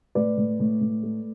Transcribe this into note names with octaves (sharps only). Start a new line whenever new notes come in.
A2 B4 D5
A2
A2
A2
A3